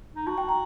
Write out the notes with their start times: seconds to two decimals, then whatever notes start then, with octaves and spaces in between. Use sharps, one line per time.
0.16 D#4
0.27 F#4 A5
0.38 G5
0.49 A#5